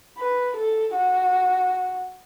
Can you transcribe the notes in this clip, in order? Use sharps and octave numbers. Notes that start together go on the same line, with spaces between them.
B4
A4
F#4